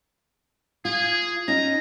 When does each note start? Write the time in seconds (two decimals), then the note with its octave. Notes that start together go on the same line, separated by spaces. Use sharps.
0.85 F4 G#4
1.48 C#4 D#4 A#5